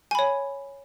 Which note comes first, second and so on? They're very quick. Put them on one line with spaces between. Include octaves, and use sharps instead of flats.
G#5 B5 C#5